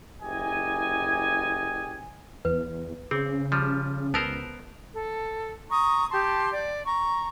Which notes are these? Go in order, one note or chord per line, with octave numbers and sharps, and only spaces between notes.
F#1 E4 G4 D#5 G#5
E2 B4
C#3 C4 G#4
F3 G3
C#2 B3 A#4 C5 A5 E6
A4
A#5 C#6 D#6
G4 A5 C6
D5
A#5 C#6